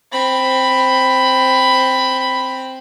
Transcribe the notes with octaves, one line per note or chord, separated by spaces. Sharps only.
C4 B5